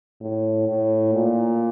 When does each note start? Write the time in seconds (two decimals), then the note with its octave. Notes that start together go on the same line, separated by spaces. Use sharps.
0.21 A2
0.68 A2
1.14 A#2